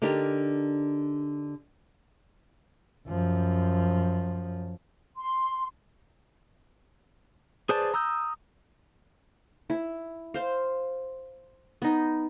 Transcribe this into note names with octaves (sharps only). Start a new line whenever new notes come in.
D3 D4 D#4 G4 A#4
F#2 F3
C6
G#4 B4 C5 D5 A5
A#5 D#6 E6 G6
E4
C5 F5
B3 D#4